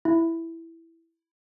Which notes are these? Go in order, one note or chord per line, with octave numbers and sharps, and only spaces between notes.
E4